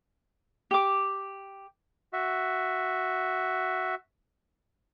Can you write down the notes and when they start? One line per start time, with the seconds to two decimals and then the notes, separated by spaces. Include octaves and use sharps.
0.71 G4 D6
2.13 F#4 E5